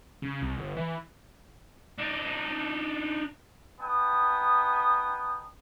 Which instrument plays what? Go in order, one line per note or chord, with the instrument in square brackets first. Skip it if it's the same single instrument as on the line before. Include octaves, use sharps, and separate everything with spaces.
[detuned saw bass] C#3
C2
G1
E3
[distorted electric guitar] D4 D#4
[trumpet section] B3 D#4 G5 A5 D#6